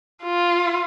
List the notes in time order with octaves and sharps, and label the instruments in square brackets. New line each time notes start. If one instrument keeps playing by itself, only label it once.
[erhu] F4